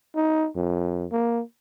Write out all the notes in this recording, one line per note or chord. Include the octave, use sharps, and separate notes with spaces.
D#4
F2
A#3